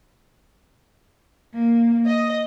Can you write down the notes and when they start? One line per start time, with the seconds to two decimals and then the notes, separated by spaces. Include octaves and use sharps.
1.53 A#3
2.05 D#5